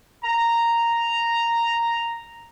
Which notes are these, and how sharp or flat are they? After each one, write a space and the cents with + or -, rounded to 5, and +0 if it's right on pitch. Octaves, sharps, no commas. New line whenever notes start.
A#5 -5